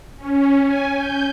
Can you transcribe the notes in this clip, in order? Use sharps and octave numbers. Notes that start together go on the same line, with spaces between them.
C#4
G#5
G6